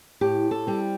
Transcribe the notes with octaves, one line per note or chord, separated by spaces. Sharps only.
A2 G4
A4
G3 C4